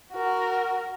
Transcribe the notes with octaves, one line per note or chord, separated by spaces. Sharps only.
F#4 A#4